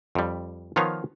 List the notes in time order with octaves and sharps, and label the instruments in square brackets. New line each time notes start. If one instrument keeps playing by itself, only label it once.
[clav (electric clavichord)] F2 G3
D#3 F3 B3 D#4 C#5 F5